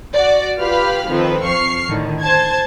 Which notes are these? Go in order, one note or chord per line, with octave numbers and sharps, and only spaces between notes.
F#4 D5
F4 G4 B4 F5 B5 F6
D#3 F3 C4 A4 B4
F2 C#6 F6 C7
A2 D3 D#3
C5 A5 G#6